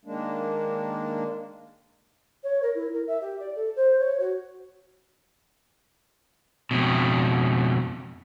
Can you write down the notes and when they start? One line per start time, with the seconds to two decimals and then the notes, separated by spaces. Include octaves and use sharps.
0.05 D#3 G#3 A#3 D4
2.44 C#5
2.62 A#4
2.75 E4
2.93 A#4
3.07 E5
3.21 G4
3.40 D5
3.55 A4
3.76 C5
3.99 C#5
4.20 F#4
6.71 F2 B2